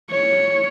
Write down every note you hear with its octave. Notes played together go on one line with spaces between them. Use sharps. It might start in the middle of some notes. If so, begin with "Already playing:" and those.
C#5